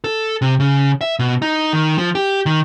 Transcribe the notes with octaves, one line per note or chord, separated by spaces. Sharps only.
A4
C3
C#3
E5
B2
D#4
D#3
F3
G4
D#3